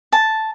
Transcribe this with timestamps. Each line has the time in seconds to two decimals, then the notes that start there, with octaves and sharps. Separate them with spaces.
0.12 A5